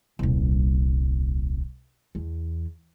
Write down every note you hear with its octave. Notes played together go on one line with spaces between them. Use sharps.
D#1 C2
E2